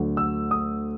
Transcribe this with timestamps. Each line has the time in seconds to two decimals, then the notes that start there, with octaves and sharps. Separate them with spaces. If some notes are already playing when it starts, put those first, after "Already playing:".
Already playing: D2 D3 F#3
0.17 E6
0.51 D#6